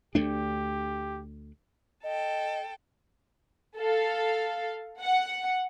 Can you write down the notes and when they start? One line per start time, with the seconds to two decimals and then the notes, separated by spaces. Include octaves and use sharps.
0.15 D2 A3 D4 G4
2.03 A4 D#5 G5
3.78 A4 F5
5.01 F#5